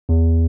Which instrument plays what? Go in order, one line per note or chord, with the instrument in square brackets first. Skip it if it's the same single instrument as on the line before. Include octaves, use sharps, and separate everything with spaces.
[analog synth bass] E2